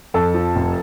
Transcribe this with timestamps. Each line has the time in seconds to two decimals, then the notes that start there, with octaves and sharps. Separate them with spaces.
0.14 F2 A4
0.34 F3
0.56 F1